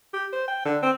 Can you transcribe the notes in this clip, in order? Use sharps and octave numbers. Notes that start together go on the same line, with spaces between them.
G4
C5
G5
D3
C4